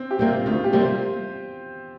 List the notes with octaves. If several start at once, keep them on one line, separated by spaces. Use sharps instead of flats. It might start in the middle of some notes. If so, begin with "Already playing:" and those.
Already playing: C4
G4
C3 G3 A#3
F4
D2 F4
G4
C3 G3 A#3
C5